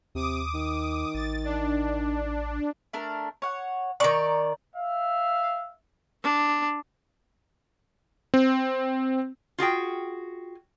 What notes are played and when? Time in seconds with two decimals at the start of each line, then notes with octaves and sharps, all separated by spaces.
0.15 D#2 C3 D6 D#6
0.54 D#3
1.14 A1 A6
1.44 D4
2.93 A3 D4 A#4
3.42 C#5 F#5
4.00 D#3 D5 A#5 B5 C#6
4.76 E5 F5
6.23 D4
8.34 C4
9.58 F4 F#4 G#4 G5